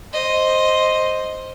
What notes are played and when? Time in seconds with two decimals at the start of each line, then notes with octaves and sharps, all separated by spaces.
0.14 C5 D#5